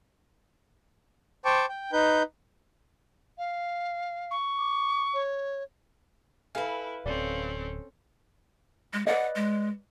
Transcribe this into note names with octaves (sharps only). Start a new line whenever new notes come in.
C5 G5 A5 C#6 D6
G5
D#4 B4 G6
F5
C#6
D6
C#5
E4 A4 B4 F5 G#5
D1 C4 C#4 A4 D5
G#3
B4 D5 D#5 F#5
G#3